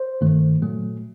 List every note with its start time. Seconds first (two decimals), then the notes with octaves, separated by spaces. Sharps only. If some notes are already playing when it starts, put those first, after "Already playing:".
Already playing: C5
0.21 G2 D#3 A3
0.62 A#2 F#3 A3